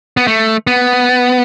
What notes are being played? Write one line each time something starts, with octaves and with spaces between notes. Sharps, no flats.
B3
A3
B3